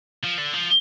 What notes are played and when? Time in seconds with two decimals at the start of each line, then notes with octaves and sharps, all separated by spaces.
0.24 F3
0.39 D3
0.54 F3